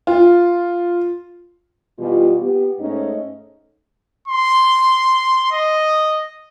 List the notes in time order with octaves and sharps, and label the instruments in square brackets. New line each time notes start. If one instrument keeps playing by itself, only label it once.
[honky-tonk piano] F4
[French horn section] B2 E3 G3 F4
B3 G4
G#2 A3 C#4 D#4 D#5
[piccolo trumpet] C6
D#5